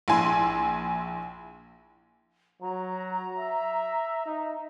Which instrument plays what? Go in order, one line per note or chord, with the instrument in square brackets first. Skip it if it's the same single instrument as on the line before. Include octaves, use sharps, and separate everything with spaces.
[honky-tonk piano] A#1 E4 G#5 C6
[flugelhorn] F#3 [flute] A#5
[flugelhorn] E5
D#4